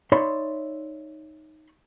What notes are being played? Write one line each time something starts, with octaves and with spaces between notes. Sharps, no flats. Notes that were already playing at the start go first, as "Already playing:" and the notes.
D#4 C#5 D5 E5 B5 C6